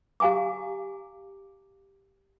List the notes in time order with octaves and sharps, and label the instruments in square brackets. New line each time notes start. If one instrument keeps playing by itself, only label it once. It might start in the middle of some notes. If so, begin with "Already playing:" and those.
[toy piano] G4 F5 G#5 A#5 D6